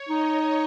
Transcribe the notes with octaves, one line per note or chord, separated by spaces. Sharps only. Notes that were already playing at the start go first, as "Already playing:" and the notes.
Already playing: C#5
D#4 D#5